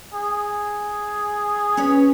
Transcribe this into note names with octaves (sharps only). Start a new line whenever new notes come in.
G#4
C#4 B4 C#5